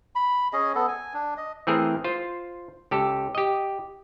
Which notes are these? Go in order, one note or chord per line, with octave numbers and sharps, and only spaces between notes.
B5
C#4 G#4 D#5
B3 A4
G#5
D4
D#5
E3 A3 C4 G#4 A#4
F4 C5
C#2 G4 A4
G4 D#5